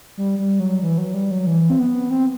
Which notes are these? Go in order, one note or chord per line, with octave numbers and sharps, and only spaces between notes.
G3
G3
F#3
E3
F#3
G3
F#3
E3
C4
B3
C4